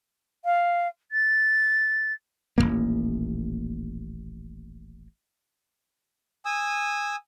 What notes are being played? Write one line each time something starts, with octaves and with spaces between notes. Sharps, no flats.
F5
A6
D#1 A1 A2 A#3
G#5 D#6 E6